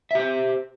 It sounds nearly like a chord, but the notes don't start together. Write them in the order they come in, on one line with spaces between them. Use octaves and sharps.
E5 G4 C5